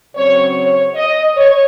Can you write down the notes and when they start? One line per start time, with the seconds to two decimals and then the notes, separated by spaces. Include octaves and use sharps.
0.15 C#3 F#3 C4 C#5
0.55 C#5
0.95 D#5
1.36 C#5